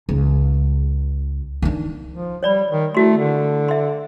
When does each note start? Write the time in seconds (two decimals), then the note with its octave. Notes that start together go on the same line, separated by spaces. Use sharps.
0.09 C#2
1.62 D#3 D4
2.14 F3
2.43 G3 C#5 D5 B5
2.71 D#3
2.95 A3 E4 F#4 C6
3.18 D3
3.68 E5 C6